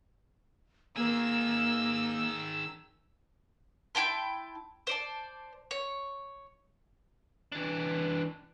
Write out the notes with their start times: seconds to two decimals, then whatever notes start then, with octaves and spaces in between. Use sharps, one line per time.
0.97 D#3 A#3 G#4 E6
3.95 E4 G5 A5 C6
4.87 C5 D5 A5
5.71 C#5
7.52 E3 D4